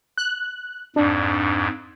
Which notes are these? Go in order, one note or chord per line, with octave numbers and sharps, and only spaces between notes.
F#6
F2 G#2 D4